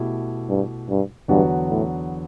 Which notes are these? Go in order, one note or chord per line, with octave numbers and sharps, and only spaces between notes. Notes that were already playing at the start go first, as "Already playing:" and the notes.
Already playing: B2 A3 E4 G4
G2
G2
E2 G2 D3 F#3 B3 F#4
A2